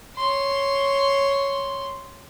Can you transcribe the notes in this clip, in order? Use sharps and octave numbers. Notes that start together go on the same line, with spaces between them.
C#5 C6